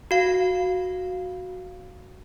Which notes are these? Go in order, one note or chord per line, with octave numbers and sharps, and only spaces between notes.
F#4 F5